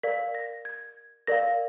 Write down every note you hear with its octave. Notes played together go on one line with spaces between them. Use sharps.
A#4 D5 F5 B6
A#6
G#6
A#4 D5 F5 A#6